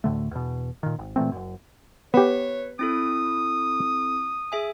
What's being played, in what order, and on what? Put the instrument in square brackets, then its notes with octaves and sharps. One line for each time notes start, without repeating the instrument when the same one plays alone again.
[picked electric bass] D2 A2 D3 A3
E2 B2
A#2 D#3
G#1
A#2 E3 A3 C4
F#1 F#2
[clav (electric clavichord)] B3 G4 [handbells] B4 B6 [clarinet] C#5
[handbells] C4 E4 A4 [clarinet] D#6
[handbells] G#4 E5 G#5